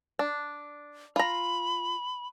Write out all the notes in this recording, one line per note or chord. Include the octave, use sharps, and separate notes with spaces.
D4
F4 A#5 B5